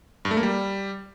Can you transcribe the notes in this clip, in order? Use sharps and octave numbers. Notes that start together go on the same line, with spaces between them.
G2
A3
A#3
G3